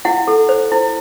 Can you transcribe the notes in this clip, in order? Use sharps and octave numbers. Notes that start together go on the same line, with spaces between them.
E4 F#5
A4
C5
E4